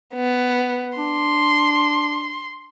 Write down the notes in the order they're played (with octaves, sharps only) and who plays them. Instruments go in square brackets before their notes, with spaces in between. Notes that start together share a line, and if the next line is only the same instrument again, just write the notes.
[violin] B3
[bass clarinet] D4 [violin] C6